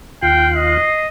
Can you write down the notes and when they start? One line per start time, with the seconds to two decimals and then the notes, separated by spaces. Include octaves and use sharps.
0.22 D#2 F4 G5 F#6 C7
0.56 D#5